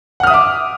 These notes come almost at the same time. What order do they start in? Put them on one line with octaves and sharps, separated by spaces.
F#5 F6 D#6 E5 D6